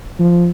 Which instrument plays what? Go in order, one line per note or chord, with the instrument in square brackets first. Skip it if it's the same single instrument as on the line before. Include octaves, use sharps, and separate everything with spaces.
[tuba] F3